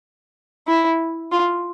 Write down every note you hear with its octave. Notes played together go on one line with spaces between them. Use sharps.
E4
F4